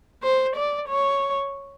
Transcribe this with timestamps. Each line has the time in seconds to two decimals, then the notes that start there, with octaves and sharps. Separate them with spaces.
0.23 C5
0.56 D5
0.88 C#5